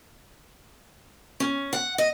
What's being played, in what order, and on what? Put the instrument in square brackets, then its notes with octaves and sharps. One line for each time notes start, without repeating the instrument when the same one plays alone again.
[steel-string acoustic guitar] C#4
F#5
D#5